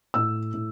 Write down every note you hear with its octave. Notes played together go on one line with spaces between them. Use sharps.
A2 E6
A2